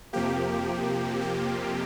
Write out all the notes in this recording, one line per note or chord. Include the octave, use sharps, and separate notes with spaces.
F2 C3 F3 A#3 G4
G4